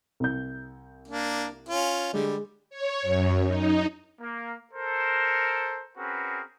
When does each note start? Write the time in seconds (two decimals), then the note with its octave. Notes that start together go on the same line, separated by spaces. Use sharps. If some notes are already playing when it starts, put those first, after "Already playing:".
0.20 C2 G6
1.08 A#3 D4
1.69 C#4 F4
2.13 D3 G3 G#3
2.70 C#5
3.02 F#2
3.47 D#4
4.20 A#3
4.72 A4 A#4 C5
5.97 C4 C#4 F#4 G#4 A#4 B4